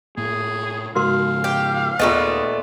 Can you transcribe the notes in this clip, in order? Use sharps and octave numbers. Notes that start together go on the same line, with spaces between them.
A2 A#3 G#4
G#2 C#3 G#3 F#4 A#4 F5 C6
G4
D#2 A#2 A3 B3 F4 G#4 D#5